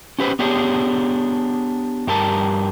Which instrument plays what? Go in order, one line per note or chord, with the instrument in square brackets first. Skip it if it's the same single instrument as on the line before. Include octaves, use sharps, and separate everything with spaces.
[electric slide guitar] C#4 G4 B4 C5
B3 D4 G4 G#4 C#5
G2 G3 A#4 A5